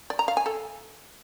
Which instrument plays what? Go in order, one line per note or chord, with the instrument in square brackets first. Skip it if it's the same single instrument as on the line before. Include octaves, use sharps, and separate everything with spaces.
[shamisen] D5
A#5
F5
G#5
A4